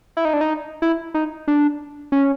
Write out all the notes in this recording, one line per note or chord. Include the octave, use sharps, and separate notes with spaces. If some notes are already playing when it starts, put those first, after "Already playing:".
E4
D#4
D4
D#4
E4
D#4
D4
C#4